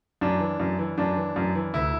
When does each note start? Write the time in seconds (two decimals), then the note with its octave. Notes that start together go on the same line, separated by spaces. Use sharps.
0.21 F#2 D4
0.40 E3
0.60 F#2
0.79 E3
0.98 F#2 D4
1.17 E3
1.36 F#2
1.55 E3
1.74 D2 E4